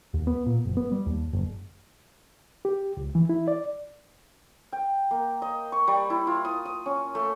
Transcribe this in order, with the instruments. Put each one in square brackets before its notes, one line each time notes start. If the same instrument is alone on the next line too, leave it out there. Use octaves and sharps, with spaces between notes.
[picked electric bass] D#2
B3
A#2
F#1
B3
G3
D#2
F#1
[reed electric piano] G4
C#2
E3
E4
D5
[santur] G5
A#3
D#5
C#6
G3
E4
F4
D#6
D#6
C#4
A3